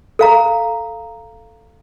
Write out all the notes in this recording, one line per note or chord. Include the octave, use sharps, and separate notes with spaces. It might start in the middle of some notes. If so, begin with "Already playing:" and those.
A4 F5 A#5